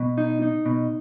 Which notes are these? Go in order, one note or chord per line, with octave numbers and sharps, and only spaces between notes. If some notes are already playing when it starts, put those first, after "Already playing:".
Already playing: B2
D#4
D#4
B2